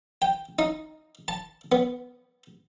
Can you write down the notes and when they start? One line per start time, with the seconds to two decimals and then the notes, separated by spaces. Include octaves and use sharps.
0.22 G5
0.59 D#4
1.28 A5
1.72 B3